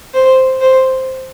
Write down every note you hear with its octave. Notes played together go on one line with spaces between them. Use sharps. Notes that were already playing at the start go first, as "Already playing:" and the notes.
C5
C5